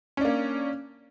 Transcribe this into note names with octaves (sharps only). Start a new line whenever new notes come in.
A#3 C#4 D4